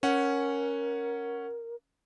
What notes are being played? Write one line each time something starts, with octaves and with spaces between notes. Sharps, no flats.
C#4 A#4 F#5